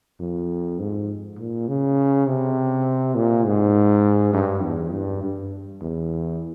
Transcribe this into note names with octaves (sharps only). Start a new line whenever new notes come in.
F2
G#2
A#2
C#3
C3
A#2
G#2
G2
E2
G2
G2
E2